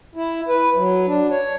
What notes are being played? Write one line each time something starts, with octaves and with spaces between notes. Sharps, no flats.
E4
B4
F#3
D4
C#5